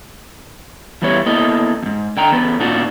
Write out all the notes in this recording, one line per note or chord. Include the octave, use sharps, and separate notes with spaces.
E3 G3 B3 E4 C#5
A#3 B3 E4 A4 D#5
F2 G#2
D3 G5 A#5
E2 B3 A4 B4
A#2 B3 D4 D#4 F4 F#4